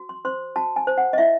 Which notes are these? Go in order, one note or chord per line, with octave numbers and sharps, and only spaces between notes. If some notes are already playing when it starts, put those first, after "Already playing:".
Already playing: F#4
C6
C5 C6
F#4 A5
G#5
C5
F#5
D#5
E4 E5